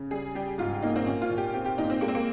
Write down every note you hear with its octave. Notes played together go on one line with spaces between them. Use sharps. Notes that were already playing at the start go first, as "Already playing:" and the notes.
Already playing: C#3
G3 G#4
G3 G4
G#2 F4
A#3 D#4
C4
A#2 C#4
F4
A#2
G4
C4 G4
G4
A#2 D#4
C4
G#3 A#3
C4
A#3